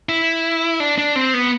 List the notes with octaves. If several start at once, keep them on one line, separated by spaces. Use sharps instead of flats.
E4
D4
D4
C4
B3